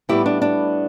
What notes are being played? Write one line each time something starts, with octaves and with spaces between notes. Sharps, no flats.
A2 G3 B3 E4 G4
D4
D4